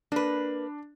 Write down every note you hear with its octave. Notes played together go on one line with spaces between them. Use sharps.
A#3 D4 B4